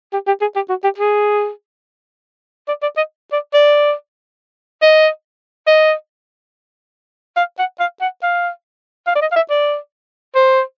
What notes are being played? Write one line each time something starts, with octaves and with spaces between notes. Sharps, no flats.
G4
G4
G#4
G4
F#4
G4
G#4
D5
D5
D#5
D5
D5
D#5
D#5
F5
F#5
F5
F#5
F5
F5
D5
D#5
F5
E5
D5
C5